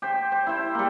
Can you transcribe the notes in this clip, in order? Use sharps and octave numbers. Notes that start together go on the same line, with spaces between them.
G4 C5
C5
E4 C5
G3 A#3